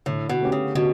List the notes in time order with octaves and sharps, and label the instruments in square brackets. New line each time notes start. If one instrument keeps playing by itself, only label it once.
[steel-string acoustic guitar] A2 [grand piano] D3
[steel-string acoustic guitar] B2
[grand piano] A3 C#4 G4
[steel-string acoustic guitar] C#3
[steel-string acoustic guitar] B2 [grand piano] D3